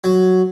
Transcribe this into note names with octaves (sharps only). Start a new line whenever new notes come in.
F#3